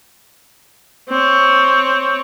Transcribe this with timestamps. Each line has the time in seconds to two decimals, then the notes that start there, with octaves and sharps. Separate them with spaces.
1.09 C4 C#5